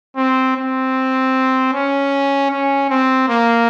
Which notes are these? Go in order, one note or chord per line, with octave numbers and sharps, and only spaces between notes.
C4
C4
C#4
C#4
C4
A#3